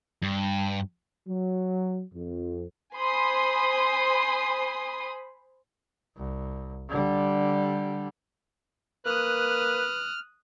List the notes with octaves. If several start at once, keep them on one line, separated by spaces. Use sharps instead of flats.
G2
F#3
F2
C5 G#5 B5 C6 D#6
C2
D3 G3
A#3 B4 D#6 F6 F#6